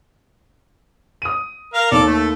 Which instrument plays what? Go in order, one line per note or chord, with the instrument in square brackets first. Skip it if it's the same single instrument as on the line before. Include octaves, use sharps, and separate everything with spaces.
[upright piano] D#6 D#7
[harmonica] A#4 F5
[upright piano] D#2 D#3 [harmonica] A4 D5
[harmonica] A3